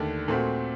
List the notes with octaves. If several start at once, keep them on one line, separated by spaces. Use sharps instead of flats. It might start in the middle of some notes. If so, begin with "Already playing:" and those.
Already playing: D#2 D3 A3 D4
A#2 A3 C4 F#4